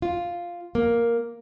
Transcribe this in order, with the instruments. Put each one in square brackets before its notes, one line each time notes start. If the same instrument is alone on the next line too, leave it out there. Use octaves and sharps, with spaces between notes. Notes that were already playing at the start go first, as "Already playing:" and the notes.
[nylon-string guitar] F4
A#3